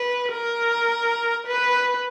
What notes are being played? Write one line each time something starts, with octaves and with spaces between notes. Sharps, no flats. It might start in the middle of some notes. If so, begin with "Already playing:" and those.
Already playing: B4
A#4
B4